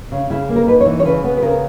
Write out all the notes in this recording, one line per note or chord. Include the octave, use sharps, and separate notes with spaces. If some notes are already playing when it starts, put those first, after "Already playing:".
C#3
C#3 E4
A#3
A#4
D#4 B4
C#5
E3
C#5
C#3 B4
B3
B4
C#3 A#4